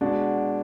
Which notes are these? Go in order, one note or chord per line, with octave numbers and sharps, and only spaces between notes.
B2 G#3 D4 F#4